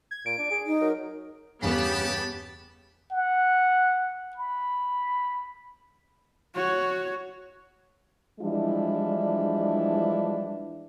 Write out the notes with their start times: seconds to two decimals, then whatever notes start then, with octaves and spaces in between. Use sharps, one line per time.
0.11 G#6
0.26 A#2 D7
0.38 D4
0.51 G#4
0.66 D#4
0.81 F#3 A#4
1.63 E2 G2 C#3 B3 G4 A5 B5
3.12 F#5
4.36 B5
6.56 F#4 C#5
8.40 E3 F3 G3 G#3 D4 E4